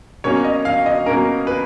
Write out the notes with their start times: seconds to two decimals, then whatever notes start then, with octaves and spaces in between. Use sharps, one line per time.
0.24 B2 A#3 C#4 C#5
0.44 D#5
0.65 F5
0.86 D#5
1.06 B2 A#3 C#4 A#4
1.47 B4